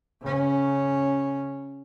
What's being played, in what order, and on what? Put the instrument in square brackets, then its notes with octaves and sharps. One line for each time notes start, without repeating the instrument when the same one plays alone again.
[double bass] C#3 C#4